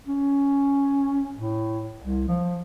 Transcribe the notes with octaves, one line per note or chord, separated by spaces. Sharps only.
C#4
A2
C2
F3